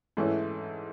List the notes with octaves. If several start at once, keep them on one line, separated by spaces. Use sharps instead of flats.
G#2 E3 A3 C#4 E4